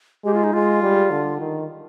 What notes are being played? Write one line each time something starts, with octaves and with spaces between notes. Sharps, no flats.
G#3 G4
F4
D#4
G#3 F4
G3
D3
D#3